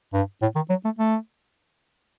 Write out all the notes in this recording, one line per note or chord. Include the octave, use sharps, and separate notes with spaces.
G2
A2
D#3
F#3
A3
A3